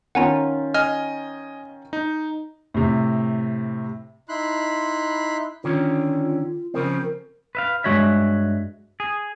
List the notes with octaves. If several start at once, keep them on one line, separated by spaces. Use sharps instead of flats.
D#3 C#4 F4 F#5 G#5 A#5
D#5 G#5 F6
D#4
A2 C3
D#4 E4 B5 C6 F#6
D3 D#3 C#4 F4
C#3 F3 C4 A#4
B4 E5 F5
G2 G#3 F#4 C#5 E5
G#4